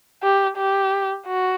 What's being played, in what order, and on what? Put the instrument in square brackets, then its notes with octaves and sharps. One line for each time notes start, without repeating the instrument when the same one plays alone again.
[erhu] G4
G4
F#4